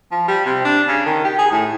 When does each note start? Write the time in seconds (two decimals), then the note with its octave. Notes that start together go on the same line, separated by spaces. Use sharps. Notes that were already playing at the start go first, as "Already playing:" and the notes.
0.12 F3
0.28 G3
0.45 C3
0.65 D4
0.88 C#3
1.06 D#3
1.25 G4
1.39 G#4
1.52 A2